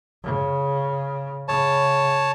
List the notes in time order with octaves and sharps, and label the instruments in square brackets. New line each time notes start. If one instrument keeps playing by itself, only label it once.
[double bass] C#3
[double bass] C#3 [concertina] C#5 A5